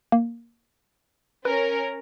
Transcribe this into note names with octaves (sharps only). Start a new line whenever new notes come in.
A#3
C#4 A#4 B4